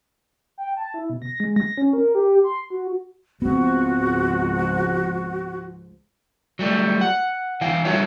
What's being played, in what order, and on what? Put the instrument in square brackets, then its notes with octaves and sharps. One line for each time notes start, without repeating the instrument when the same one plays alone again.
[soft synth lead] G5
A5
E4
B2
A#6
G#3
A#6
C#4
A#4
G4
C6
F#4
[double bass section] C#2 G#2 F3 [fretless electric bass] B3 C4 [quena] F#4
[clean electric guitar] F#3 G3 A3
F#5
E3 E4 F5 G5
G3 F4 F#4 A4 C#5 E5